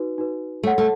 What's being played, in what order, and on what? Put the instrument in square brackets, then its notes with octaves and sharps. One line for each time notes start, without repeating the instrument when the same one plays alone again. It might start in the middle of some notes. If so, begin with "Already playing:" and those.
Already playing: [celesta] D#4 F#4 B4
D#4 F#4 B4
[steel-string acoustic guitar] A3 [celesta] A4 C#5 F#5
[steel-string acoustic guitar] A3